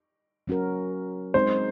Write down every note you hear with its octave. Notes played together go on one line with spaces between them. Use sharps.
F#3 C#4 F#4 A#4
G#3 C4 D#4 C5